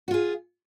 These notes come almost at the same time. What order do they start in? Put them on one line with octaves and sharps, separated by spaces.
F#4 F4 G#4